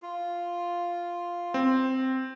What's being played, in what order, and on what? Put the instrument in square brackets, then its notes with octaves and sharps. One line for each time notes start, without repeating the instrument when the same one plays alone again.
[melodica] F4
[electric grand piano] C4